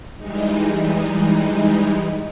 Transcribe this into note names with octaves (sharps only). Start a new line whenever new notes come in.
E3 G3 G#3 D#4